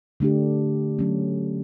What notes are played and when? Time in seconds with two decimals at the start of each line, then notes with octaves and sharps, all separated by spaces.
0.20 D3 A3 D4 G4
0.99 F#3 A3 C#4